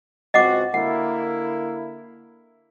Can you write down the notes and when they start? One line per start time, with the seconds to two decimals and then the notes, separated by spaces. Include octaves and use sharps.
0.34 C#2 C4 F#4 D#5 F#5 D6
0.74 D3 A#3 E4 F#5